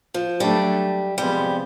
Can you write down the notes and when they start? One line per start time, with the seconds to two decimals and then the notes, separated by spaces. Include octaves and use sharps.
0.14 F3
0.40 F#3 G3 A3 D4
1.18 C3 F3 G3 G#3 B3